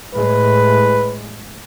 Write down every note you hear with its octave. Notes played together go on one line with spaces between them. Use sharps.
A2 G#3 B4